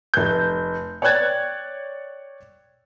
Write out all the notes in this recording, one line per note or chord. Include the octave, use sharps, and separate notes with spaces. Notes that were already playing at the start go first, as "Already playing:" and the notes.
F1 G6
C#5 D5 G5 F#6 G#6 A6